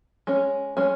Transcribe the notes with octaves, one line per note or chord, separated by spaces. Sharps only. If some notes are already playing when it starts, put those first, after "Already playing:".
G#3 C#4
G#3 C#4